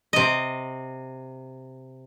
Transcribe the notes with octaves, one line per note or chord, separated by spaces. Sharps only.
C3 D#5